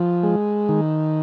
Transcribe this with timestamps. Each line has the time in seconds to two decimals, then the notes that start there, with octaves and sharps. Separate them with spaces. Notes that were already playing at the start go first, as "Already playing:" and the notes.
Already playing: F3
0.23 G#3
0.69 D#3